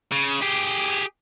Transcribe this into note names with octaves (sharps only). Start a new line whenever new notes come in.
C#3
G4 G#4